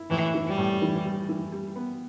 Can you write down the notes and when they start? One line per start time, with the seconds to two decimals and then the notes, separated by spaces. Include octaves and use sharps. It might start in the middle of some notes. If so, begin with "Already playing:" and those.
Already playing: E4
0.10 A2 E3
0.34 E3
0.47 G3
0.57 A2
0.82 E3
1.04 G3
1.29 E3
1.52 G3
1.76 B3